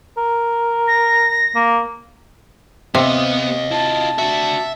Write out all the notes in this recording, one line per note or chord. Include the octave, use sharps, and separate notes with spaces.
A#4
A#6
A#3
C3 B3 D#5 F5
E4 F4 A5
D4 F#4 E5